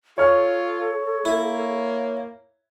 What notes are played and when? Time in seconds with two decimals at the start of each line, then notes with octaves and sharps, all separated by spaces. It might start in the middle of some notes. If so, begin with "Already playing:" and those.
0.18 F4 A4 C#5 F6
1.25 A#3 E4